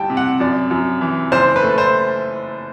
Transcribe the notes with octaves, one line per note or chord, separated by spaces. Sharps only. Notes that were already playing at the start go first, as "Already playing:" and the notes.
Already playing: D2 G3 G5 A5
C3
F#5
F#2 D5
F#2
E3
F#1 C5
B4
A3
C5